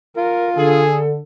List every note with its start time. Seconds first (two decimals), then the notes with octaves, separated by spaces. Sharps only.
0.17 F4 A#4
0.57 D3 G#4 A4